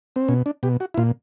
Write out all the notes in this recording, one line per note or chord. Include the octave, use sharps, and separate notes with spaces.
C4
B2 C#4
D4
B2 G4
F#4
E4
A#2 F4